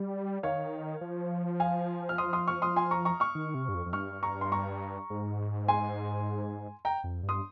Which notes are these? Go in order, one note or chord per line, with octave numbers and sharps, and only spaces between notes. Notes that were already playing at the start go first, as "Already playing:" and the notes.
Already playing: G3
D#3 C#5 F5
F3
F5 G#5
F6
C6 D#6
C6 D#6
C#6 F6
C6 D#6
G#5 C6
A#5 C#6
A#5 C#6
C#6 F6
D#3
C3
G2
F2
F2
G2 C#6 F6
A#5 C#6
C6
A#5 C#6
G#2
G#5 C6
G5 A#5
F2
G2
C6 D#6